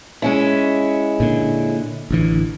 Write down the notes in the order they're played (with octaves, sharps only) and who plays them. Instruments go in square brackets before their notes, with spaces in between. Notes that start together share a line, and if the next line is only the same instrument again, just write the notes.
[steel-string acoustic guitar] G#3 C#4 E4
[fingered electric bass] A#2 D3
A1 D3 E3